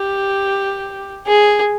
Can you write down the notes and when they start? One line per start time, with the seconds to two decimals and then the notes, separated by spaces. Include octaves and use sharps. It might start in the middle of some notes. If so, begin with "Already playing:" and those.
Already playing: G4
1.26 G#4